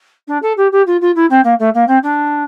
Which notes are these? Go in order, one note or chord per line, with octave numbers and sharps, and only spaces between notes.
D4
A4
G4
G4
F4
F4
E4
C4
A#3
A3
A#3
C4
D4